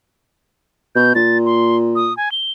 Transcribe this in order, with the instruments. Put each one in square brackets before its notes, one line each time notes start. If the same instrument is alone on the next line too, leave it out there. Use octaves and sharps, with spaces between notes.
[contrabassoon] B2 [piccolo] G6
[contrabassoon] A#2 [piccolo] A6
[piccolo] C6
D#6
G#5
G7